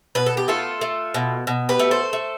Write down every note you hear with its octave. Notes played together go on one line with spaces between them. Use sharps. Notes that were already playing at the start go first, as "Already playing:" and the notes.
B2 B4
A4
G4
A3 F4 A4
A3
B2
B2
G4 B4
A3
A4 C5
A3